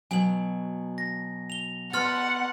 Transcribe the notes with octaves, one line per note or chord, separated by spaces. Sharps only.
B2 F#3 G#5 F#7
A#6
F7 G7
B3 F#5 C6 F6 A6